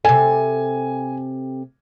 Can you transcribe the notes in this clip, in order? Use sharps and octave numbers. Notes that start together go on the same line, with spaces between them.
C3 A4 G#5